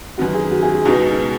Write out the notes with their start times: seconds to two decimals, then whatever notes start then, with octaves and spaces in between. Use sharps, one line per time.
0.18 F#2 D#3 B3 F#4
0.34 G#4
0.51 F#4
0.62 G#4
0.74 G#4
0.85 C#2 B2 G#3 B3 D#4 F#4